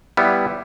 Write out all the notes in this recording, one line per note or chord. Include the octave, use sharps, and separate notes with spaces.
G3 B3 E4